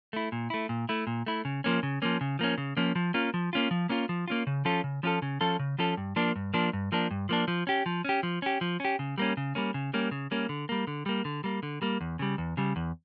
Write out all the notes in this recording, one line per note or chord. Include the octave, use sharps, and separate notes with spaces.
A3 E4
A#2
A3 E4
A#2
A3 E4
A#2
A3 E4
C#3
F3 A#3 C#4
C#3
F3 A#3 C#4
C#3
F3 A#3 C#4
C#3
F3 A#3 C#4
F3
A#3 C#4 F4
F3
A#3 C#4 F4
F3
A#3 C#4 F4
F3
A#3 C#4 F4
C#3
F3 C#4 F4 A4
C#3
F3 C#4 F4 A4
C#3
F3 C#4 F4 A4
C#3
F3 C#4 F4 A4
G2
F3 A#3 D4
G2
F3 A#3 D4
G2
F3 A#3 D4
G2
F3 A#3 D4
F3
C#4 G4
F3
C#4 G4
F3
C#4 G4
F3
C#4 G4
C#3
G3 A#3 C#4
C#3
G3 A#3 C#4
C#3
G3 A#3 C#4
C#3
G3 A#3 C#4
D3
G3 A#3
D3
G3 A#3
D3
G3 A#3
D3
G3 A#3
E2
C#3 G3
E2
C#3 G3
E2